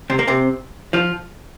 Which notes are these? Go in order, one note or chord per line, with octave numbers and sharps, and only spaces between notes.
C3 C4
A#3
C3 C4
F3 F4